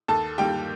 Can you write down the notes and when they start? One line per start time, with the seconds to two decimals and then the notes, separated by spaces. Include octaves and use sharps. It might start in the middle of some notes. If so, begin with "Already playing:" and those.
0.08 D#2 A4 A5
0.38 D#3 G3 A#3 G4 G5